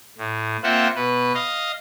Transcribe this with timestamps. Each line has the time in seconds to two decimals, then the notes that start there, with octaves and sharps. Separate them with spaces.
0.18 A2
0.63 A#3 C4 F4 C5 E5 F#5
0.95 B2 B4
1.34 D#5 F5